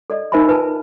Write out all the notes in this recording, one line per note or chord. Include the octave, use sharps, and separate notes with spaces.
A4 D5 D#5
D#4 A#4 C5 E5 G#5 B5
F4 B4 G#5 A5